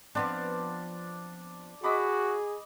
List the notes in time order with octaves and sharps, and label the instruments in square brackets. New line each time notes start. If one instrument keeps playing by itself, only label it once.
[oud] F3 B3 C4 [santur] D4 D5 C6
[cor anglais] F#4 [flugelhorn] G#4 [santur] D#5 B5 D6